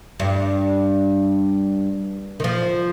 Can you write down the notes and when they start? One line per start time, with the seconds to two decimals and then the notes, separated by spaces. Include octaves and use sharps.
0.20 G2
2.40 D#3
2.44 F3